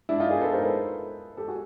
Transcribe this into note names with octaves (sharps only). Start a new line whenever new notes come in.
D4 E4
D#4 F4
G#4 A#4
A4 B4
A#4 C5
A4 B4
G4 A4
F#4 G#4